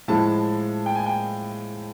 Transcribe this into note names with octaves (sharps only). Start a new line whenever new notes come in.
A2 F3 G#3 A5
G5
G#5
G5